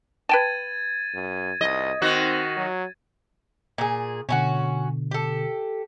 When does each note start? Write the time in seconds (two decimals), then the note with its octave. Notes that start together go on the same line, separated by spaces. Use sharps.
0.29 B4 G5 A5 G#6 A6 D#7
1.15 F#2
1.61 C2 D#5
2.02 D#3 C4 F#4
2.57 F#3
3.78 A#2 G#4
4.29 B2 D3 C#4 D#4 F#4
5.11 G4 A4